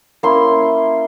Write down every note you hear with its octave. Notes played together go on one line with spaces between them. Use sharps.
A#3 C#4 E4 C6